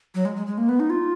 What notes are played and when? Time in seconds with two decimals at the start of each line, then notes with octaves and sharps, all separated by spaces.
0.15 F#3
0.25 G#3
0.36 G#3
0.47 G#3
0.58 A#3
0.69 B3
0.80 D#4
0.90 F4